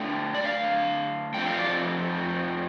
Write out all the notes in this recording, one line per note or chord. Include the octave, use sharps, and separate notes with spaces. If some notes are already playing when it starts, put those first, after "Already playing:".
Already playing: D3 A3 D4 G5
D5
F5
F2 F3 A3 C4 G5
F5
D5